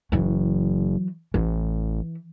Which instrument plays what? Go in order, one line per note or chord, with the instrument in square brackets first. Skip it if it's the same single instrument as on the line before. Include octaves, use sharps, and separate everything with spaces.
[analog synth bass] F#1 [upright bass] E3 F#3
[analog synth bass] A1 [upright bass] E3